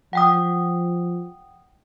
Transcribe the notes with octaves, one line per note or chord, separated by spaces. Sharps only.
F3 F#5 G5 D#6